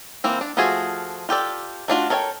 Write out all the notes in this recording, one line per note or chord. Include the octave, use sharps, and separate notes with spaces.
E3 A#3 C4
D4
F3 A3 F4 F#4 G#4
F4 G4 A4 D5
A3 D4 F4 F#4
A4 A#4 C#5 F5 G5